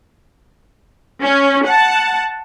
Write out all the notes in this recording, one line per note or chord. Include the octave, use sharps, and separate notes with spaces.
C#4
F#5 A5